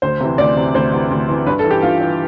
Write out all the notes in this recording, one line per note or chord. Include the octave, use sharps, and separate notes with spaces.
D2 C5
C3 E3
D2 D5
C3 E3
D2 C5
C3 E3
D2
C3 E3
G2 B4
A4
E3
G4
G2 F4
E3